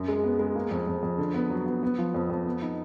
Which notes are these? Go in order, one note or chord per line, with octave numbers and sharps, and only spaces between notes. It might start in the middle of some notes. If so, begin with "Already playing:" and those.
Already playing: F#2
G#3
B3
G#3
A#3
F2
F2
F2
D3
B3
F#3
B3
B3
F3
F2
F2
B3
D#4